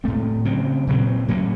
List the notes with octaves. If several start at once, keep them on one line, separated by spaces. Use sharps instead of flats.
A2 A3 C4
C#3 F#3 C4
A#2 F#3 C4
A2 F#3 A#3 C#4